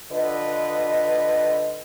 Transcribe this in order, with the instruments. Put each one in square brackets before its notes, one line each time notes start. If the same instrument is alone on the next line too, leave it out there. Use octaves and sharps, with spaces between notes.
[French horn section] D3 F4 B4 D#5